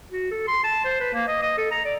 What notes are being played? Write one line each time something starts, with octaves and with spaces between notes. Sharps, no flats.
F#4
A4
C6
A5
C5
B4
A#3
D#5
D#5
A4
A#5
D5